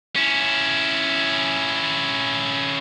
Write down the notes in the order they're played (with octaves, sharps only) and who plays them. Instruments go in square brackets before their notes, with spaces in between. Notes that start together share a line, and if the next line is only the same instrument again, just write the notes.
[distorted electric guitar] C#4 E4